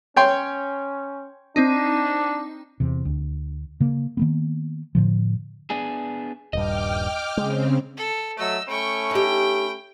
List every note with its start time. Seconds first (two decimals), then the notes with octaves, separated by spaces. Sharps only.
0.16 C#4 C#5 G5 C6
1.56 C4 D4 D#4
2.80 E2 C3
3.05 D2
3.80 C#3 A#3
4.17 D#3 A#3 B3
4.95 A2 D3 F3
5.70 B3 D4 G#4
6.53 D#1 G2 D#5 G5 D6 F6
7.37 C#3 G#3 C4
7.97 A4
8.38 F#3 A3 D#5 E6
8.68 A3 C#4 G5 B5 C#6
9.11 D#4 G4 G5